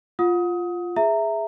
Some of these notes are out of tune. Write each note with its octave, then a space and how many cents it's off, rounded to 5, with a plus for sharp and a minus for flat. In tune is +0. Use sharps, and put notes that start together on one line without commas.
F4 +0 F#5 -30 D#6 +25
G#4 +0 E5 +0 A#5 -20